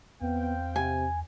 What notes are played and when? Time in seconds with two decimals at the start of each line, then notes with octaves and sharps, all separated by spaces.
0.21 E2 B3 C4 F5 G5
0.76 C3 G#5